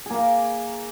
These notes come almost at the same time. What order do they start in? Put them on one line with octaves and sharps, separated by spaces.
G#4 A#3 A#4